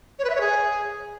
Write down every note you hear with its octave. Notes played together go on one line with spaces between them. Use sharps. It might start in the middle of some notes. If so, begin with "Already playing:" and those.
C#5
B4
E5
C#5
G#4